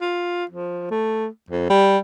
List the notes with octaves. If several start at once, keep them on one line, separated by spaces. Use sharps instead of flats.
F4
F3
A3
F2
G3